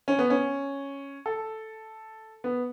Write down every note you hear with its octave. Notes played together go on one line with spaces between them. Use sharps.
C#4
B3
C#4
A4
B3